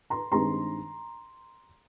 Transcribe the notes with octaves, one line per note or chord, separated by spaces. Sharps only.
A#5 C6
G2 D#3 G#3 C4 A#5 C6